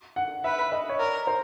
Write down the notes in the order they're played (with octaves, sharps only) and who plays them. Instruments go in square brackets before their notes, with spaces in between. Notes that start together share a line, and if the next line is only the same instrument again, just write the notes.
[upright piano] F#5
[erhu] B4 [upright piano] E5
[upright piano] D#5
C#5
[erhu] A#4 [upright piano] D5
[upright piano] C5